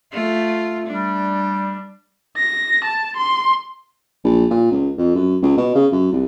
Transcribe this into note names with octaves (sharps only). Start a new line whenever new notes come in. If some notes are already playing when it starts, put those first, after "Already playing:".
A3 F4
G3 D4
A#6
A5
C6
A#1
A#2
C#2
F2
F#2
C#2
B2
C#3
F#2
C2